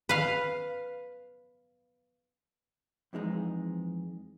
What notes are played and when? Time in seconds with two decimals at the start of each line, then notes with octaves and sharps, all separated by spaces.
0.09 B4 F5
3.13 F2 E3 G#3 D4 D#4